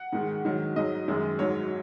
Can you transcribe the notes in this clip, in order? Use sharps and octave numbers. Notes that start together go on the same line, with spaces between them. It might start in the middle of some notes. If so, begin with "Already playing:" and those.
Already playing: F#5
G#2 D#3 G#3
G#2 D#3 F#3
G#2 F#3 D#5
F#2 D#3 G#3
G#2 F#3 C#5